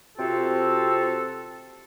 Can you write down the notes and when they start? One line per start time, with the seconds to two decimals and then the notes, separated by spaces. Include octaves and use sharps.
0.19 C3 C4 F4 F#4 A4